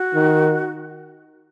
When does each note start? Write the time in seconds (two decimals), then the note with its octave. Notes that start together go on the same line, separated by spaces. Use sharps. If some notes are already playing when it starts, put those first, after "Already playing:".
Already playing: F#4
0.15 D#3